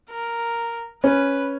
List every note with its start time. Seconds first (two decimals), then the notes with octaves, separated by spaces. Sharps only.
0.10 A#4
1.03 C#4 B4